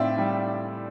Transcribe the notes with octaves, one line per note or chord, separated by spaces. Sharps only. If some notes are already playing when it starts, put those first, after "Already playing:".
Already playing: A2 C4 F4 D5 E5
G3